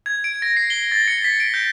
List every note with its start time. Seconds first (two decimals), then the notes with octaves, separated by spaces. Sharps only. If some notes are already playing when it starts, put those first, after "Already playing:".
0.06 G#6
0.24 D7
0.42 A#6
0.57 C7
0.70 G7
0.92 A6
1.08 C#7
1.24 B6
1.40 D7
1.54 G6